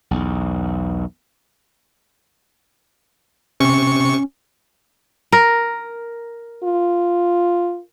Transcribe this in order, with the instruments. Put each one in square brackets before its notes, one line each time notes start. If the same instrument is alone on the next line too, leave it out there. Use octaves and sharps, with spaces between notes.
[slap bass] B1 E2
[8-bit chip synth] C3 C#6 [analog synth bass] C#4
[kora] A#4
[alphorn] F4